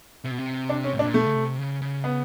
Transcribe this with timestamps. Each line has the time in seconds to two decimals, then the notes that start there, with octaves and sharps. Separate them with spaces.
0.24 C3
0.31 B2
0.38 C3
0.69 D4
0.84 C#4
0.94 A2
0.99 D4
1.04 A#2
1.14 B2 A3
1.26 C#3
1.36 C3
1.59 C#3
1.81 C#3
2.04 B3